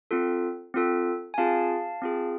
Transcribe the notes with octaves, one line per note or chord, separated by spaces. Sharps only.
C4 F4 A4
C4 F4 A4
G#5
C4 F4 G#4 F5 A5
C4 F4 G#4